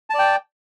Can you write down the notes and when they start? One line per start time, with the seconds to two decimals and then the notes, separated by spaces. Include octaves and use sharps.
0.10 A5
0.14 D5
0.19 G5